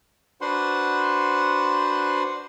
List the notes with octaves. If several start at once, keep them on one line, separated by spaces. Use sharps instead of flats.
D4 F#4 B4 C5 F#5 C6